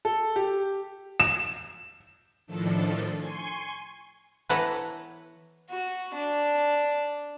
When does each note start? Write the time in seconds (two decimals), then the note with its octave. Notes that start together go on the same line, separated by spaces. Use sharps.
0.05 A4
0.36 G4
1.20 E7
2.47 A2 D#3 F3 D4 A4
3.19 G#5 C6 C#6
4.49 E3 B3 A4 B4 C#5 A#5
5.70 F#4
6.15 D4